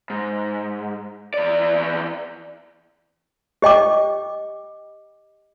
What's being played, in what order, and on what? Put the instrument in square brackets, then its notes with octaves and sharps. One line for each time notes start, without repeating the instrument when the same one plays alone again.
[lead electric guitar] G#2
E2 D5
[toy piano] G4 D#5 G5 D6